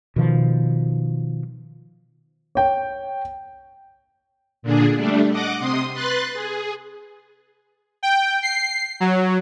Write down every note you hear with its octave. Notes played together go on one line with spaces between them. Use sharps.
B2 D#3 F3
C#5 G5
A#2 D3 D4 G#4
G3 A3 D4
D#5 F#5 D6
C3 C6 D#6
B4 C6 F#6 A6
G#4
G5
C7
F#3